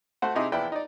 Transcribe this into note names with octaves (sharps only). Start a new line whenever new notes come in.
A3 F#4 C5 F#5
C3 C4 D#4 E4 G4 G#4
E2 F3 E4 B4 D5 G5
D#4 D5